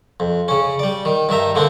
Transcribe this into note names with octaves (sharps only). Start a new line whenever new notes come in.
F2
C#3 C#4
G3 D5
D#3
G2 D#3 E5 A#5
D3 A#3 C4 D4